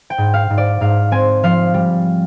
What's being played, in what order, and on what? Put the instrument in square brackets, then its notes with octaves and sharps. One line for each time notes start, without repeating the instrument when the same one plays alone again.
[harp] G5
G#2
F5
G#2
D5
G#2 F5
C4 G#5
F3 F5
G3